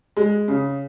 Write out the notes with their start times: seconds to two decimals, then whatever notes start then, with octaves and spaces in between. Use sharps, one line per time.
0.17 G#3
0.48 C#3